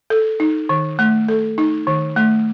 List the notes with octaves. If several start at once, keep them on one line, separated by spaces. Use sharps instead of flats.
A4
D#4
D#3
A3
A4
D#4
D#3
A3